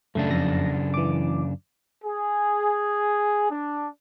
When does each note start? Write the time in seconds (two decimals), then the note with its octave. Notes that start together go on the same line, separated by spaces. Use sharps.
0.15 F#2 C#3 A3 D4
0.31 F2 A#6
0.94 E3 D6
2.03 G#4
3.50 D4